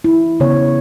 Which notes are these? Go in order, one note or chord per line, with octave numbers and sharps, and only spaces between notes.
E4
C#3 B3 C#5